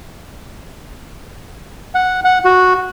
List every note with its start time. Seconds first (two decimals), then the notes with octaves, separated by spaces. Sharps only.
1.95 F#5
2.24 F#5
2.45 F#4